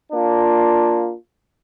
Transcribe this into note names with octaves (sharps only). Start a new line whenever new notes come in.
A#3 D4 F4